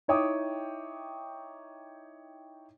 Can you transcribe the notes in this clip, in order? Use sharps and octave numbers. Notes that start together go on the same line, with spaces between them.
D#4 E4 C#5 G5 D6 D#6